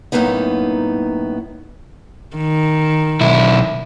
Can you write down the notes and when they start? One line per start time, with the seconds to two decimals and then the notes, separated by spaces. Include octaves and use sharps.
0.12 F#2 A2 C#3 A#3 B3 D#4
2.37 D#3
3.21 B1 E4